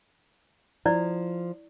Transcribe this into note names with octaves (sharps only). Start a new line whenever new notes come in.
F3 E4 D5